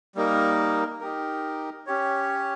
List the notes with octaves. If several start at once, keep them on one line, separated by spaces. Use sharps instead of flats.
G3 A#3 D#4 A#4
D#4 G4 A#4
C#4 G4 C#5